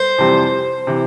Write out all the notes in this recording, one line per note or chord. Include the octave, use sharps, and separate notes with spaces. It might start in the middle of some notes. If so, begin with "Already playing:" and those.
Already playing: C5
F2 C3 E3 G3 C4
C3 E3